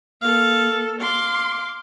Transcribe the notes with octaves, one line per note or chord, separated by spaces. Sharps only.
A#3 A4 F5
F5 C6 D6